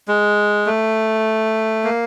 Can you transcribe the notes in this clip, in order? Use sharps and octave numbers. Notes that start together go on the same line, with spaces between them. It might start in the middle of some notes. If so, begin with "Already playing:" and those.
G#3
A3
A#3